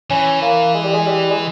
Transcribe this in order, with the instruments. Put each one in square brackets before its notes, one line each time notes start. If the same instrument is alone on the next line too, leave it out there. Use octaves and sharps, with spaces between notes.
[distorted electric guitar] E3 [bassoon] C#4
[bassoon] A#3
G#3
G3
G#3
G3
G#3